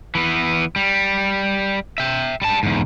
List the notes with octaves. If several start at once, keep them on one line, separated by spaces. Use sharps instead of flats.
E3 B3
G3
E5 G5
G3 A5
E2 G#2